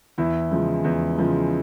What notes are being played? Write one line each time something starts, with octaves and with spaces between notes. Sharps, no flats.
E2 E4
C#3 F3 G#3
E2
C#3 F3 G#3